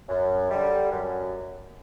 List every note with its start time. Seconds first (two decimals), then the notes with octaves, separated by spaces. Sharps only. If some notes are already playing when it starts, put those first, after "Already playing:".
0.09 F#2
0.51 D3 G3
0.91 F#2